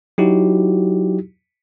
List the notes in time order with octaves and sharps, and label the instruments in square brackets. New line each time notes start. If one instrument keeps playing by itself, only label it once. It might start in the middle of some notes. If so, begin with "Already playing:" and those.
[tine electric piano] F#3 D#4 E4 F#4 G4